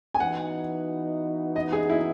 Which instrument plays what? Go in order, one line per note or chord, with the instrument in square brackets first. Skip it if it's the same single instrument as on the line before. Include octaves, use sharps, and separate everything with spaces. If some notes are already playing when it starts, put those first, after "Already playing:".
[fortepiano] G#5
[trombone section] E3 B3 D#4 F#4 [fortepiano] F#5
[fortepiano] D#5
G#4
E4